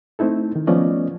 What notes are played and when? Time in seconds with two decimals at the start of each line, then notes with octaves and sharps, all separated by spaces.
0.19 A3 C4 D#4 E4 A4
0.56 D#3
0.67 F3 A3 B3 C#4 D5 D#5